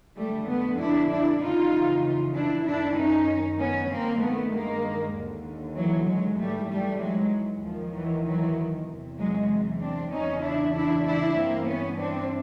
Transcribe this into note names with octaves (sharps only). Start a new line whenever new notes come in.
F2 D3 G3 A3
A3 B3
D4 E4
D4 E4
F2 C#3 E3 D#4 F4
D4 E4
F#2 D#3 D4 E4
C#4 D#4
B3 C#4
G2 D#3 A#3 C4
A3 B3
G#3 A#3
D#2 D3
E3 F#3
F#3 G#3
G#2 E3 G3 A3
G3 A3
F#3 G#3
D#2 D#3 F3
E3 F#3
E3 F#3
E2 C3 E3
F#3 G#3
C4 D4
E2 C#3 E3 C#4 D#4
D4 E4
D4 E4
D4 E4
G2 E3 A#3 C4
B3 C#4
C4 D4